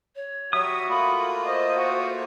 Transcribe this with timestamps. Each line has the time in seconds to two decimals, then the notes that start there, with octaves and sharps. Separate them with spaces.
0.15 C#5
0.53 F#3 G3 F#4 E5 D#6
0.89 A3 A#3 F4 B5
1.46 C5 D#5
1.76 F#4